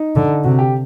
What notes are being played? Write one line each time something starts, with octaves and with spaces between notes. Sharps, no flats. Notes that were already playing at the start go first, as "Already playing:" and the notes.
Already playing: D#4
D3
C3 F#4
G4